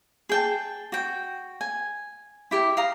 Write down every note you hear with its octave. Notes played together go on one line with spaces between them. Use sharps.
G#4 G5 A5
F#4 G5
G#5
E4 G4 E5
F5 A#5 D#6